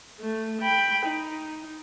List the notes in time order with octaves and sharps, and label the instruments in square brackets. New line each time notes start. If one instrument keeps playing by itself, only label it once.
[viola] A3
G5 B5
D#4